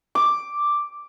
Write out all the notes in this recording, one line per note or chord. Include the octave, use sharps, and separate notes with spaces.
D6